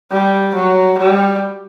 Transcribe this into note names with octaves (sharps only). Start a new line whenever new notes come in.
G3
F#3
G3